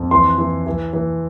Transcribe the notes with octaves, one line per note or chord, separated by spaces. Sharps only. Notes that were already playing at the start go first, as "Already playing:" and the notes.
Already playing: F2
E3 C6
E3
E3
E3